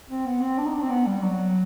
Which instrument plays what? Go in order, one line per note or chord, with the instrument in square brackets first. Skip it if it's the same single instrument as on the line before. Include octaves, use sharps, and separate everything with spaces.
[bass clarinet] C4
B3
C4
D4
D#4
D4
C4
B3
G3
F#3